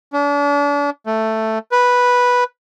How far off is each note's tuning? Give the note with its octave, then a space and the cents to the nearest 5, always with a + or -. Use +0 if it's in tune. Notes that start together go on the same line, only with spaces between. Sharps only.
D4 -40
A3 +5
B4 -5